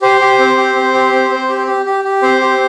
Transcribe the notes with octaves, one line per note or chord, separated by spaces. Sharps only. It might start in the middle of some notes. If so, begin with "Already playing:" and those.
G4 C5
G4
C4
G4
C4
G4
C4
C4
G4
G4
G4
G4
C4 C5
G4